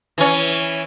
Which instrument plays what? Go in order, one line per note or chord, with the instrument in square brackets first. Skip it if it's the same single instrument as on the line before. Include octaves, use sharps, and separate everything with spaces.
[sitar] E3 C#4